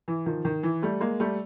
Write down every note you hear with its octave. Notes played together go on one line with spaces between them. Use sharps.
E3
D#3 F3
D#3
E3
G3 A3
G#3 A#3
G3 A3